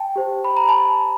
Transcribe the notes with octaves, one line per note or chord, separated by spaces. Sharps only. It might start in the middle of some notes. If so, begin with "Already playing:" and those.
Already playing: G5 A5
G4 C5
B5
A#5
A5 B5